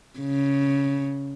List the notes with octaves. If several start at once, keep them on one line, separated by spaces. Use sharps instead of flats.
C#3